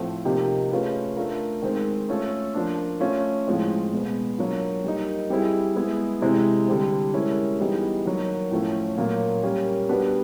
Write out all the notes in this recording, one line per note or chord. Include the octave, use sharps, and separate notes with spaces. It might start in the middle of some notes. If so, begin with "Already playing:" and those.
Already playing: A2 F3 A3 C4
C3 F3 A#3 D#4 G4
A3 C#4 F4 G#4 B4
A3 D4 F4 A#4
D#3 G#3 C4
A3 C#4 F4 A4
F3 A#3 D4
A3 C#4 F4
A2 F3 G#3 C4
B2 G#3 B3
F#3 A#3 D4 F4
G3 A#3 D#4
G3 C4 E4 G#4
G#3 B3 E4 G#4
C3 E3 G#3 C4 E4
D3 G3 C4
G#3 C#4 E4 G4 A#4
E3 G3 B3 D#4 G#4
D#3 F#3 A#3
A2 F3 A3 C#4
A#2 F#3 A#3
G3 A#3 C#4
G3 B3 D4 F#4 B4